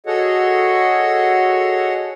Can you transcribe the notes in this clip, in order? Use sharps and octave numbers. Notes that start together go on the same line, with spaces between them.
F#4 G#4 A4 C#5 D#5 F#5